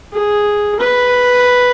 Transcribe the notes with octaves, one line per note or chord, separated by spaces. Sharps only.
G#4
B4